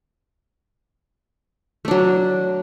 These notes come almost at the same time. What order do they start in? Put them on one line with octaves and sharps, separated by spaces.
A3 D4 F#3